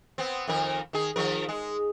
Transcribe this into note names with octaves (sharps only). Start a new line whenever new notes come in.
B3 C4
F2 D#3 A#4
D#3 G#4
D#3 F3 A#4
G#3